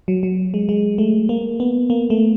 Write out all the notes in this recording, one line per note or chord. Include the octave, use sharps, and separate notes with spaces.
F#3
F#3
G#3
G#3
A3
A#3
B3
A#3
A3